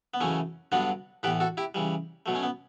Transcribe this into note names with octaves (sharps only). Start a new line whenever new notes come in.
B3
F#2 C#3 E3 A3 C#4
G2 D3 F#3 B3 D4
A2 E3 B3 G4 B4
F#4 A4
E4 G4
C#3 E3 G3
B2 F#3 A3
C#4
B3